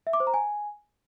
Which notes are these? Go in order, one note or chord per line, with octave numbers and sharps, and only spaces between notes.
E5
D6
C5
A#5
G#5